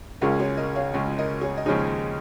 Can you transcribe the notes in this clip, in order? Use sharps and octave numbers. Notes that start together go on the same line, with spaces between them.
C#2 C#3 G#3 C#4 F4 A#4
G#4 C#5
A#4 D#5
C#5 F5
C#2 C#3 G#3 C#4
A#4 D#5
G#4 C#5
D#5
D#2 C#3 F3 G#3 D#4 G#4 C#5